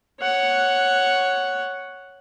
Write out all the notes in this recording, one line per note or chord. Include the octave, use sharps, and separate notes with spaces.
C#5 F#5